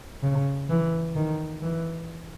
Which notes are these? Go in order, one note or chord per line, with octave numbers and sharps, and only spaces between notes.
C#3
E3
D#3
E3